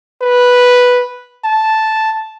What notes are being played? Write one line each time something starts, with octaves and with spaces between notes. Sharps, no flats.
B4
A5